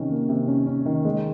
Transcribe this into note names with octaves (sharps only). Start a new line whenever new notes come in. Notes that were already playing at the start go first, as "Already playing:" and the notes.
Already playing: C3 D#3 C#4
A#3
C3
C#4
C#4
D#3
G#3